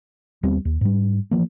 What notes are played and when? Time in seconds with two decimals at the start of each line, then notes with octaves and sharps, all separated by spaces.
0.43 D#2 G3 B3 C4
0.65 D#2
0.81 G#2 G3
1.31 E3 F3 A#3